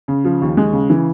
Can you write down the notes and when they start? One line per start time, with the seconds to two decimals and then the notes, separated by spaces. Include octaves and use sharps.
0.08 C#3
0.25 F3
0.42 D#2
0.57 G#3
0.73 C#3
0.90 E3